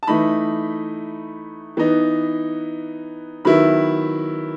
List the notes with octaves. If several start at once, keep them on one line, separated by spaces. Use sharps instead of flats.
A5
E3 A3 D#4 B5
E3 B3 D#4
D#3 F#3 B3 E4 B5